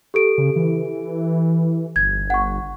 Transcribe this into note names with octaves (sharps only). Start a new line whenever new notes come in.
G4 A4 D7
C#3
E3
G1 G#6
F#5 C#6